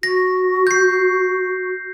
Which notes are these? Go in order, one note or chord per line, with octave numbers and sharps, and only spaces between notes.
F#4 A#6
G6 C7